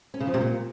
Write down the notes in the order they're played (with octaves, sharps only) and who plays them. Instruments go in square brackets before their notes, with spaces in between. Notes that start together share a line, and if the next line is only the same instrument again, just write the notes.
[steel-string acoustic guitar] C#4
C#3
F3
C3
A#2